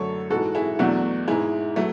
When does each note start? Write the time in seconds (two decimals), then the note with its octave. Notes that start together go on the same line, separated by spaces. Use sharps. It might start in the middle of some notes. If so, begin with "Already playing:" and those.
Already playing: F#2 D3 F#3 A3 A4 C#5
0.30 G#2 E3 G#3 F#4 A4
0.55 E4 G#4
0.79 E2 B2 F#3 A3 D4 F#4
1.28 G#2 G#3 E4 G#4
1.76 F#3 A3